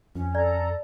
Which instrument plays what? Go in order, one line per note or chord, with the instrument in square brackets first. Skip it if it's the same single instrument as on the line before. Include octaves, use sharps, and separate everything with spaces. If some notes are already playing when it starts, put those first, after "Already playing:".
[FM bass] F2 [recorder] C#4
[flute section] A4 A#5 [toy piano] D5